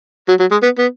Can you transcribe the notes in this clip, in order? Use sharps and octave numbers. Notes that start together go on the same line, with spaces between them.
F#3
F#3
G#3
B3
B3